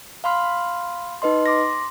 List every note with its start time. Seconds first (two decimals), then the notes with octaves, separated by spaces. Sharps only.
0.24 F5 B5 C6 F6
1.22 D#4 B4 D#5 C6
1.46 C6 D6 A#6